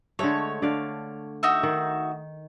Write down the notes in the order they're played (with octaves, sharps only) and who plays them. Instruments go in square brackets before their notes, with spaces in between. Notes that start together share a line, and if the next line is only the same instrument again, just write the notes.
[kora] D3 G#3 A3 [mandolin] C#5
[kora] D3 D5 F5
[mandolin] D#4 F#4 E5
[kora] D#3